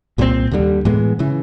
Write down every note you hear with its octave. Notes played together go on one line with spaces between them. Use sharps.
C2 A#2 G3 C4
D#2 D3 G3
A2 E3 G#3 B3
C#3 E3